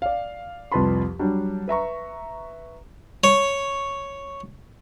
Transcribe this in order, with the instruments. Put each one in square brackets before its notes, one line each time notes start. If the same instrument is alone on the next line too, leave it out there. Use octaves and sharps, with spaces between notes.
[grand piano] D5 F5
C2 F2 B4 A5 B5 C6
F#3 G3 D4
B4 E5 A#5 C#6
[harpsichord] C#5